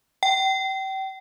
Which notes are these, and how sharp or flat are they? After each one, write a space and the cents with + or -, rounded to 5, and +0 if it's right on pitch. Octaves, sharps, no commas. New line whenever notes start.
G5 -35